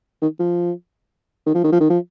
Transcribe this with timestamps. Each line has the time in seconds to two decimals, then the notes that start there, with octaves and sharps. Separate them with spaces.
0.22 D#3
0.40 F3
1.46 D#3
1.55 F3
1.64 D#3
1.72 F3
1.80 D#3
1.90 F3